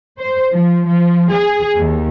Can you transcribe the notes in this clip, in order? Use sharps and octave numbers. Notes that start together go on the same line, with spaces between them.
C5
F3
F3
G#4
D#2